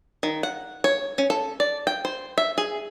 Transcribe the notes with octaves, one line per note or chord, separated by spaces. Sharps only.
D#3
F#5
C#5
C#4
A4
D5
G5
C5
E5
G#4